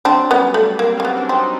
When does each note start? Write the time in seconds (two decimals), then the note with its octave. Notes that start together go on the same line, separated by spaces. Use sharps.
0.05 F#3 C4 D4
0.30 G3 B3 C#4
0.54 G3 A3
0.79 A#3 C4
0.97 A#3 C#4
1.05 B3
1.17 D4
1.29 C4
1.35 D#4